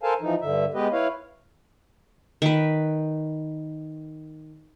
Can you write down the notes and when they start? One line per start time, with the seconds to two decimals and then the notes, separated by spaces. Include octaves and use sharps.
0.03 A4 A#4 C5 F5 G#5 A5
0.21 E3 F3 D#4
0.41 G2 D3 E5
0.74 G#3 B3 G4 B4 D#5
0.92 E4 B4 C#5 F5
2.42 D#3 B4